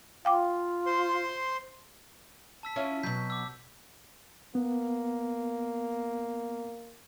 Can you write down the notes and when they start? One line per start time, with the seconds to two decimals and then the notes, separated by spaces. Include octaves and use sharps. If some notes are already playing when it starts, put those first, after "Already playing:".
0.25 F4 F5 G5 D6
0.86 C5 C6
2.63 A5 E6 B6
2.76 C#4 E4 F4
3.03 B2 F#3 G6 B6
3.30 D6 E6
4.55 A#3 B3